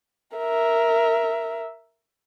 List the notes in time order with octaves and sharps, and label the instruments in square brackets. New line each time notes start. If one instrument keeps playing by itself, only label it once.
[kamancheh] A#4 E5